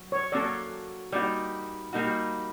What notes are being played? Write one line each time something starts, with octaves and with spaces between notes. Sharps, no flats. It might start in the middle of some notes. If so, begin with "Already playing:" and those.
Already playing: F#3
C#5
F#3 A#3 C#4 F#4 A4 D5
G3 A#3 D#4 F#4 D5
G3 A#3 D#4 F#4